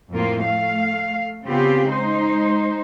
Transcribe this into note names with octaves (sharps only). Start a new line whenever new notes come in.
F2 A2 A#3 F4
A3 F5
C#3 B3 C4 F4 G4
G#3 D#4 C5